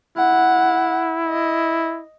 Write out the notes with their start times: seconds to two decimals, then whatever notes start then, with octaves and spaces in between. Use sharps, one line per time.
0.17 E4 F#5
1.28 D#5